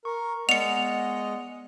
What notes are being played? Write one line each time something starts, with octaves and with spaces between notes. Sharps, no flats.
A#4 C#6
G#3 B3 D5 D#5 F#5 C#7 F7